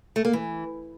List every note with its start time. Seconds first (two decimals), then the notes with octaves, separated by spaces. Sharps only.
0.16 A3
0.25 A#3
0.33 E3